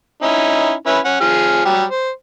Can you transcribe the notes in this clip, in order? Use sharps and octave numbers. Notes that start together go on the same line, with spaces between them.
C#4 D#4 E4
C#4 E4 B4
C#4 F#5
F3 G#4 F6
F#3 G3 G4
C5